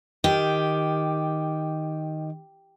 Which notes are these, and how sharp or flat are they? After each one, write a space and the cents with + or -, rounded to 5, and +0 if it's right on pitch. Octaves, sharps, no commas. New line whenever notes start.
D#3 +5 G4 +0